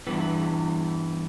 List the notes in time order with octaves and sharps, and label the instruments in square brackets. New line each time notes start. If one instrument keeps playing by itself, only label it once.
[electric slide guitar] G2 E3 B3